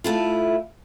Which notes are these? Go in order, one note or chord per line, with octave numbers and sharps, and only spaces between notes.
A3 E4 F4